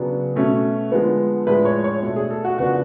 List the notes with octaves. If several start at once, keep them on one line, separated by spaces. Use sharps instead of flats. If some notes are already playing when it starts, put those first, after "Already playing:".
Already playing: C#3 F#3 B3 D4
B2 A3 C#4
D3 F3 G#3 B3
A2 F3 G#3 D4 B4
C#5
C#5
B2 A3 D4
G#4
A4
F#4
C#3 F3 B3 D4 F#4